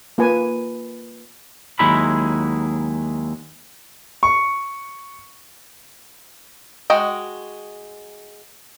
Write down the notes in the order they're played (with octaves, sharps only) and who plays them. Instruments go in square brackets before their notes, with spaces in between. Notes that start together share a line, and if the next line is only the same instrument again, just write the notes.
[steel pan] A#3 F4 B4 G#5
[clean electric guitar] D#2 F#3 G#3 D#4 E4 B5
[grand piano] C#6
[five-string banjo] G#3 F#4 D#5 G5